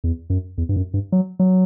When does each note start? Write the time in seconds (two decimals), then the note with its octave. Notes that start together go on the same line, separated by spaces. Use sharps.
0.04 E2
0.30 F#2
0.58 E2
0.69 G2
0.76 F#2
0.94 G2
1.12 F#3
1.40 F#3